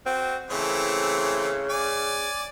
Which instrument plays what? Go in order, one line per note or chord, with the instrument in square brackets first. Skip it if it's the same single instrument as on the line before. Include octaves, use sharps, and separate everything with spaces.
[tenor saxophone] C4 [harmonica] F#4
[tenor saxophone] C#3 [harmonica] E3 A3 C4
[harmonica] D5 G#5